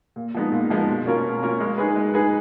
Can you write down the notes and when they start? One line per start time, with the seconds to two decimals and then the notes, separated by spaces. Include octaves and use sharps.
0.16 A#2
0.35 F3 G#3 B3 D#4
0.52 A#2
0.70 F3 G#3 B3 D#4
0.89 B2
1.06 A#3 C#4 F4 A#4
1.25 B2
1.43 A#3 C#4 F4 A#4
1.60 G#3
1.78 D#4 G#4 B4
1.96 G#3
2.14 D#4 G#4 B4